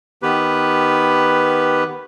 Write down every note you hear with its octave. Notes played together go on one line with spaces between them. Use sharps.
D#3 B3 G4 B4